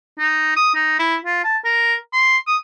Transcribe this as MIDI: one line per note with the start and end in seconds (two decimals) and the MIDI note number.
0.19 0.55 63
0.56 0.70 87
0.75 0.96 63
0.99 1.16 64
1.25 1.44 65
1.44 1.57 81
1.64 1.94 70
2.13 2.37 84
2.47 2.56 87